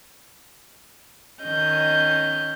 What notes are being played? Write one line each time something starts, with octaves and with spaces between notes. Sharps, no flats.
D#3 C#4 D#5 G6